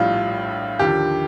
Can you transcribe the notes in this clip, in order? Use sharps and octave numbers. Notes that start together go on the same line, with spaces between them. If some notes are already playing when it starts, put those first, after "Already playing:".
Already playing: A#1 A2 G3 F4
D#2 D3 F3 G4